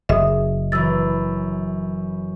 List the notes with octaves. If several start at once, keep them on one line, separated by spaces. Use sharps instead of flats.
F#1 G#4 D#5 E5 D#6
F#2 E3 E6 A6